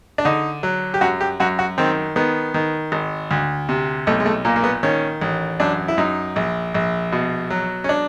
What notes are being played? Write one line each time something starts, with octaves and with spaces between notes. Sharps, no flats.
D4
D3 D#4
F#3
G4
F#2 F#4
G4
F#2 F#4
F#4
D#3 C4
D#3 B3
D#3
G#1
D2
C3
B1 A3
G#3
A3
A#2 A#3
A#3
B3
D#3 C#4
A1
F#2 D4
E4
F#2 D#4
A#1
A#1
B2
F#3
C#4
D4